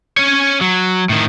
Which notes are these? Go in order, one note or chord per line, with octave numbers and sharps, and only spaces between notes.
C#4 C#5
F#3
A2 D#3